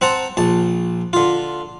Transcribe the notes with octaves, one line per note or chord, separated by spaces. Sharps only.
C4 F#5 A5 A#5
A#1 A5
D3 F4